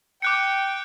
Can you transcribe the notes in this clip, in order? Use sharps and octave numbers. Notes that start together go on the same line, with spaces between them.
G5 D6 F#6 C#7